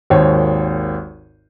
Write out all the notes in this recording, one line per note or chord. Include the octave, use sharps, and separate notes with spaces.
G#1 D#2 C5 C#5